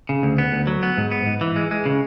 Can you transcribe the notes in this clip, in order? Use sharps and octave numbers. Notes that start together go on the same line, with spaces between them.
C#3
D2
B3
D2
F#3
B3
G#2
B3
G#2
E3
G#3
G#3
C#3